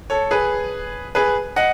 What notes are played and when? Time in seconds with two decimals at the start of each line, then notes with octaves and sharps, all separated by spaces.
0.10 A4 C#5
0.31 G#4 B4
1.15 G#4 B4
1.56 D#5 F#5